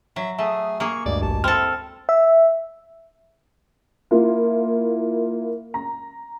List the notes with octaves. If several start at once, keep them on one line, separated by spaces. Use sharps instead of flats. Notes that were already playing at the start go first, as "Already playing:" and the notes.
F#3 E5
A3 G#4 E5 D#6
A#3 G#4 C#6
D2 G2 G#3 D5
A1 A5
C4 E4 A4 F6
E5
A#3 E4 F4
A#5